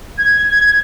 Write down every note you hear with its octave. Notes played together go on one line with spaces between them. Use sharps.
G#6